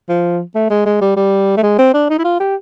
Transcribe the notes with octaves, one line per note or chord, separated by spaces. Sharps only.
F3
A3
G#3
G#3
G3
G3
A3
G#3
C4
D4
D#4
E4
F4
G4